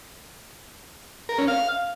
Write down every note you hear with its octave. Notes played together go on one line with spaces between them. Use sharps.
A#4
C#4
F5